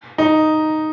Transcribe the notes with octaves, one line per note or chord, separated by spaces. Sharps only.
D#4